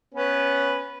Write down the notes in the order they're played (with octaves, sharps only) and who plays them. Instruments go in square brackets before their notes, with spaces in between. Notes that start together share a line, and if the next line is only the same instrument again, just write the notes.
[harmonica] B3 C#4 B4